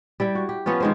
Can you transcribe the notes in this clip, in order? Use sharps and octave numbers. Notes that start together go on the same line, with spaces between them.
G3 E4 G5
F#4
G4
F3 B3 C#4 F4
D#3 G#3 C5